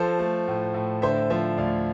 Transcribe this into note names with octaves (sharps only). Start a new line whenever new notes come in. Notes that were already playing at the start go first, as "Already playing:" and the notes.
Already playing: F3 A4 C5
A3
A2
A2
D3 C5 E5
F3 C5 E5
D2 D5 F5